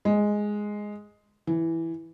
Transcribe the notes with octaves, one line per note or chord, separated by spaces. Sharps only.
G#3
E3